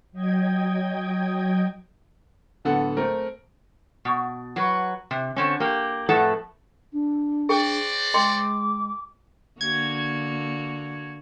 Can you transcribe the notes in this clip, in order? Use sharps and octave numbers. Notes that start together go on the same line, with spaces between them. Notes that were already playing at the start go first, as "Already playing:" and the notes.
F#3 D#5 G5 G#6
D1 D3 B3 A4 F#5
A3 C4 A#4
B2
F#3 B4
C3
D3 C4 C#4
A#3 G4
F2 A2 A3 A4 B4 F#5
D4
F#4 G#4 C5 D5 G5 D6
G#3 D#5 G5 C6 D6
D3 A#3 F#4 G#6